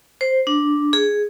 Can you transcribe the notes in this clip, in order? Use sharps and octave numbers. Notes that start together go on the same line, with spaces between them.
C5
D4
G#4